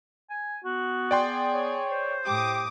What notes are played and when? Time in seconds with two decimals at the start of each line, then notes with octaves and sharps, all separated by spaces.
0.30 G#5
0.65 B3 F#4
1.11 G#4 D5 G5 C6
1.54 C#5
1.92 C5
2.26 A2 G4 D6 D#6